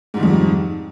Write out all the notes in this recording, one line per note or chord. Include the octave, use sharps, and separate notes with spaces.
F2 G#2 D#3 G3